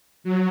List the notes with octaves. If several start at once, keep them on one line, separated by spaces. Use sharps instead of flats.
F#3